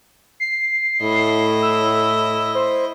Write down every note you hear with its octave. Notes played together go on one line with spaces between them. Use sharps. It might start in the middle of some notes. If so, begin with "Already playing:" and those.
C7
A2 E4 D#5
E6
C5